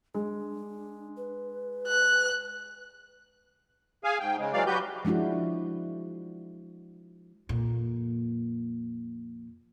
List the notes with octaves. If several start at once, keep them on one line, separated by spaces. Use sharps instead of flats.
G#3 D4
B4
F#6
G#4 F5 G#5
G#2 G5
C#3 G#3
E3 F#3 G#3 D5 F5
F#3 F#4 G4 B4 G6
F3 G#3 D4 E4 F#4
F2 A#2